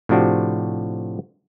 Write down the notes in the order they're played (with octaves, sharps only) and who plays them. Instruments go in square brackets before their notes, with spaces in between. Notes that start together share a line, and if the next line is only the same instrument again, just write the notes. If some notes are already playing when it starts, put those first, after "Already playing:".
[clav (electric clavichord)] A2 C3 F3 D4 F#4 G4